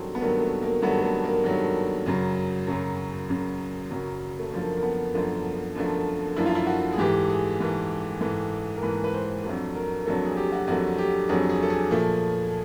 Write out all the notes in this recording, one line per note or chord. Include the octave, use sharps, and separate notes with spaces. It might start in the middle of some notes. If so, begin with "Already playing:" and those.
Already playing: G2 D#3 F#3 A3 C4
B3
G2 D#3 F#3 A3 A#3
A3
A#3
G2 D#3 F#3 A3 B3
A3
A#3
G2 D#3 F#3 A3
F#2 C#3 F#3
F#2 C#3 F#3
F#2 C#3 F#3
F#2 C#3 F#3
A3
F#2 D3 F3 A3 A#3
A#3
B3
F#2 D3 F3 A3
F#2 D3 F3 A3
F#2 D3 F3 A3 E4
F4
E4
F#4
G#4
G#2 E3 A3 G4
G#4
G#2 E3 A3
G#2 E3 A3
A#4
G#2 E3 A3 B4
B4
C5
F2 D3 F#3 A3
A#4
F2 D3 F#3 A3 A4
G#4
G4
F#4
F2 D3 F#3 A3 F#4
G4
F2 D3 F#3 A3 G#4
G#4
A4
G#4
A#2 F3 A3